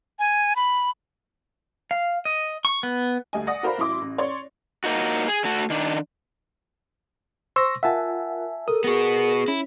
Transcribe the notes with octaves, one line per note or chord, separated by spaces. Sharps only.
G#5
B5
F5
D#5
C#6
B3
D2 G3 D#5 G#5
D5 F#5 D#6 A#6
F#4 A#4 C5 D5 F5 B5
A1 F#3 E4 C6 D6
A1
C#5 D5 C6 C#6
A#3 D#4 F#4
G#4
D3 A3 F#4
D#3 D4
C5 C6 C#6 E6 A#6
F4 A#4 E5 F#5 G#5 A5
A4 A#4 D#6
B3 F#4 G#4 A#6
C#4 E4